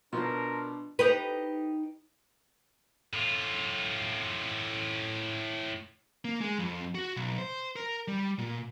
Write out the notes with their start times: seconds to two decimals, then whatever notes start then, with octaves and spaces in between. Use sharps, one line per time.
0.13 B2 F3 D4 A#4 C6
0.99 D#4 G4 B4
3.14 A2 F4
6.25 A#3
6.41 G#3
6.59 F2
6.95 F#4
7.17 B1
7.39 C5
7.76 A#4
8.08 G3
8.38 A#2